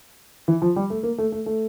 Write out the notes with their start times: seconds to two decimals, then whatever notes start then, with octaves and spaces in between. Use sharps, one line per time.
0.48 E3
0.62 F3
0.76 G3
0.90 A3
1.03 A#3
1.18 A3
1.32 A3
1.46 A3